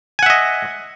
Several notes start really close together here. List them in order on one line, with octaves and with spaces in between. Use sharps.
G#5 F#5 E5 D#5